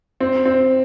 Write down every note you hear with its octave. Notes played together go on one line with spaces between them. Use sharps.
C4
C4